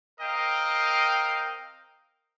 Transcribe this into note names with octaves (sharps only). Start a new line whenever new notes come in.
C4 A#4 D#5 F5 G5